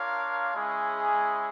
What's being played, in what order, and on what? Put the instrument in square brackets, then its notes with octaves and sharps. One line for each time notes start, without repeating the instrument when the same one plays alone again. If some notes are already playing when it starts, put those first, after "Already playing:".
Already playing: [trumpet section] D4 F4 A#4 C#5 F5
G#3 C#4 E4 G#4